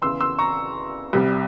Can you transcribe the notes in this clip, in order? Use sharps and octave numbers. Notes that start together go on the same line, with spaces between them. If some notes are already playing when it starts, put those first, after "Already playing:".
E2 C#3 E3 C6 E6
C6 E6
A#5 C#6
C2 C3 G3